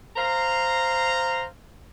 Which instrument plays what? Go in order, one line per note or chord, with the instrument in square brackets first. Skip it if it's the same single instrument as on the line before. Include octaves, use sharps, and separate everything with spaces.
[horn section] C5 F5 A#5